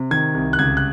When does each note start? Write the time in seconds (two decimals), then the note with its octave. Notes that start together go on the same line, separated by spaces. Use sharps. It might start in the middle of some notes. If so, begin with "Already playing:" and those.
Already playing: C3
0.11 D#3 G#6
0.34 C2
0.53 F#6
0.59 C#2 G#6
0.77 F#6